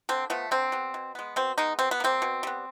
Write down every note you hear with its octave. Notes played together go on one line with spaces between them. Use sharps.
D3 C4
F3 A3 B3
D3 C4
G3 B3
B2
G#3 B3
B2 C4
G#3 B3 D#4
B2 C4
B3
G3 A#3 C4
B2
G3 B3